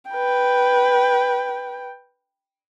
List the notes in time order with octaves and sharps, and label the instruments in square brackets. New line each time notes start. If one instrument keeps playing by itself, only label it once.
[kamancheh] B4 G5